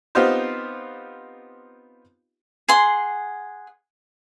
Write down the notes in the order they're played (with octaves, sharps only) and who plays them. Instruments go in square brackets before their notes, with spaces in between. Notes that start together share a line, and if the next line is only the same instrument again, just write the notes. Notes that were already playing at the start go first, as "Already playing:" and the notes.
[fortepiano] B3 C4 D#4 F4 G4 C5
[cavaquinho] G#4 F#5 C6